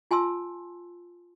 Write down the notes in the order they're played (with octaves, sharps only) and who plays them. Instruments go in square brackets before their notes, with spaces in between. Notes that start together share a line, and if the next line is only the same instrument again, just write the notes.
[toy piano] F4 G#5 A5 C6 E6